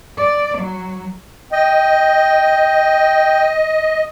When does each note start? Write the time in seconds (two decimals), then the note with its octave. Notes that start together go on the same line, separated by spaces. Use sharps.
0.17 D5
0.58 F#3
1.52 D#5 G5